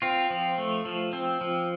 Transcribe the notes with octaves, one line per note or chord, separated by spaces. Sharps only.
C4 F4
F3
A3
F3
C4
F3